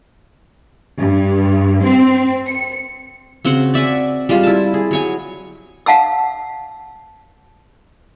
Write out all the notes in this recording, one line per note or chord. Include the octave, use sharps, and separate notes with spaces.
G2
C4
C#7
C#3 C4 F#4 F#5
D5 E5 F#5 G#5
G3 G#3 F4
E4 A5
G#4
F#3 C#5 G#5
F5 F#5 A5 E6